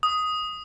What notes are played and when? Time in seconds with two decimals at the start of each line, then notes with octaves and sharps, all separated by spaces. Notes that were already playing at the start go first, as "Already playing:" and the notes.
0.03 D#6